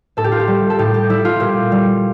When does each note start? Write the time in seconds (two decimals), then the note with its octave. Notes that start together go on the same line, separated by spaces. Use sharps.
0.17 A2 A4
0.24 G4
0.32 F4
0.40 G4
0.48 G3
0.70 A4
0.79 A2 G4
0.94 G4
1.09 G3 E4
1.25 F4
1.40 A#2 G4
1.72 G3